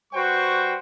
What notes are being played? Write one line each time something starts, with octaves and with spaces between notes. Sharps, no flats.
G3 F#4 B4 C5 G5 C#6